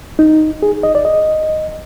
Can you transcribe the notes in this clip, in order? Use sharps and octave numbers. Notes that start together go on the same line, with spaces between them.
D#4
G#4
D#5
D5
D#5